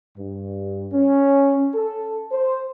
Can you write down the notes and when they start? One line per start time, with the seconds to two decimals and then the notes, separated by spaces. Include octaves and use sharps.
0.17 G2
0.93 C#4
1.75 A4
2.32 C5